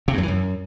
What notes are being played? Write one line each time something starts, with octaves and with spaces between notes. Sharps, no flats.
C3
G2
F#2
E3
F#2